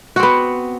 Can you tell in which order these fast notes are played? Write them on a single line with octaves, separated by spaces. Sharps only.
F#4 C4 B3